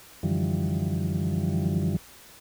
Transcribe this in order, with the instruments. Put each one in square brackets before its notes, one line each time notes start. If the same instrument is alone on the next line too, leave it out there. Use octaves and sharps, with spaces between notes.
[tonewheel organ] F#2 D3 E3 F3 G3